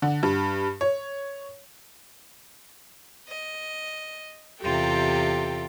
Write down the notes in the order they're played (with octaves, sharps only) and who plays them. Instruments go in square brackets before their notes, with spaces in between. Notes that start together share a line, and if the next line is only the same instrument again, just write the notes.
[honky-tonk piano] D3
G2
C#5
[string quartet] D#5
E2 C3 F4 G4 A4 G5